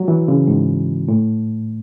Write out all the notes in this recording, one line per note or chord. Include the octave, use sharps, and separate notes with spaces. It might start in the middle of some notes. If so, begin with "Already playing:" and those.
Already playing: F#3
E3
C#3
G#2
A2